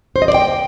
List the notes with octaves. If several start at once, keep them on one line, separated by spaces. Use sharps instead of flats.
C5
D#5
D5
G5